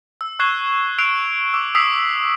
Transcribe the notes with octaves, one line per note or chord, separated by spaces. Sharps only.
E6
C#6 F#6 G#6 C7 E7 G7
E6 F#6 C7 D7 F7
D6 E6
D#6 E6 B6 C7 F#7